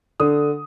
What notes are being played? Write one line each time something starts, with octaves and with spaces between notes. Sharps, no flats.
D3 D#6